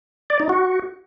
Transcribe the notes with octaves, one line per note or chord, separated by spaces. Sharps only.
D5
D#4
F#4